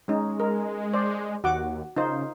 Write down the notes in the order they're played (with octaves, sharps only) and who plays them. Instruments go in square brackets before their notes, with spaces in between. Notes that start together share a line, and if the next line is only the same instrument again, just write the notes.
[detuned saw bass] G#3 [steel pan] C#4 D#4
[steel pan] A#4
C5 D5
[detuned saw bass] D#2 [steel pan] F#4 F#5 D6
[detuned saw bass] C#3 [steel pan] D#4 F4 C5